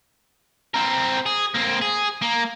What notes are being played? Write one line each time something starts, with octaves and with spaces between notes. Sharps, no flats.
C4 A#4
G#4
A#3 C4
G#4
A#3